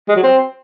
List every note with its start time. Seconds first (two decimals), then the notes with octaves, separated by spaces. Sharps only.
0.09 G#3
0.16 F#3
0.23 C4